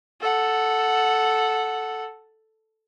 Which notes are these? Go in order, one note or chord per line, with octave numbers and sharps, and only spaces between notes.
A4 F#5